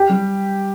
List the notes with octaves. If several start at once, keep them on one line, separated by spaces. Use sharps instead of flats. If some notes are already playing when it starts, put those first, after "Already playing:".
Already playing: G4
G3